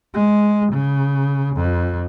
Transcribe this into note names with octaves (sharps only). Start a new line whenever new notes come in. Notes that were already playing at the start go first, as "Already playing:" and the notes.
G#3
C#3
F2